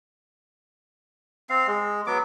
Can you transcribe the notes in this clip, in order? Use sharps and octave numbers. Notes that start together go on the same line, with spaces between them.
C4 F5
G#3
F#3 B3 D6